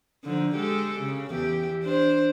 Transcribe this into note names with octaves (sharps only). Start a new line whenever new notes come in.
D3 F3 D#4
G#3 G4 A4
C#3
E2 E3 G4
D4 C5